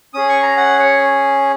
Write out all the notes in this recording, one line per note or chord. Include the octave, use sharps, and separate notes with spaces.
C#4 G#4 D#6
C#6
A#5
F#5
C#5